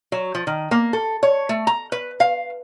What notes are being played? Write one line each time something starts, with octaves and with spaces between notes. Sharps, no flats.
F#3
F3
D#3
A#3
A4
C#5
A3
A#5
B4
F5